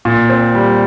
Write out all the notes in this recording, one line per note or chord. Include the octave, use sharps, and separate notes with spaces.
A#2
C4
G3